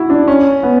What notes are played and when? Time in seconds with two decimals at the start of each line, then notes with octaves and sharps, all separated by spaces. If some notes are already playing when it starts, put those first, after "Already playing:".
Already playing: E4 F#4
0.10 D4
0.28 C#4
0.63 B3